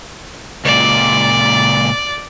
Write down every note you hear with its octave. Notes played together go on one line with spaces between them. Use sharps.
C#2 A#2 D5